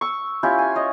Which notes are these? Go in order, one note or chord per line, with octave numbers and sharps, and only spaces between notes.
C#6 E6
C#4 E4 F4 G4
G#5
C#5 D#5